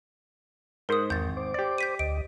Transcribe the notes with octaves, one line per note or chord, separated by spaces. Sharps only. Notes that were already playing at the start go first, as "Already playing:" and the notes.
G#2 A#4 C5 F#5 D#6
G#1 E2 G6 A6
C5 D6
G4 D5
G6 B6 D#7
D2 D#5 D7